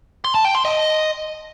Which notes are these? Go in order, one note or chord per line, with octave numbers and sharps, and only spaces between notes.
C6
A5
G5
C6
D#5